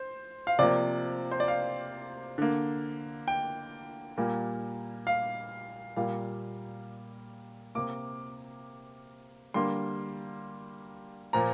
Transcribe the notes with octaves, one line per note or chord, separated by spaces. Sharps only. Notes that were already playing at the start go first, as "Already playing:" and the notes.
Already playing: C5
F5
C3 F3 A#3 D5
C5
D5
F5
D3 A#3
G5
A#2 G3 A#3
F5
A#2 G3 A#3 F5
C3 A#3 D6
D3 G3 A#3 C6
A#2 F3 A#3 A#5